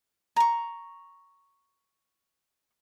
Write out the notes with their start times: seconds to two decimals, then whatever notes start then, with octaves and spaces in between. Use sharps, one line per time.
0.36 A#5 C#6